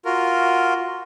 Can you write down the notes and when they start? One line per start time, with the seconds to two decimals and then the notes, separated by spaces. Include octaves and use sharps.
0.05 F4 F#4 A#4